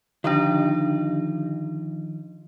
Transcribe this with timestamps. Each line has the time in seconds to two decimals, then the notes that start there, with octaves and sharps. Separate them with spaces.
0.24 D3 D#3 F3 D4 D#4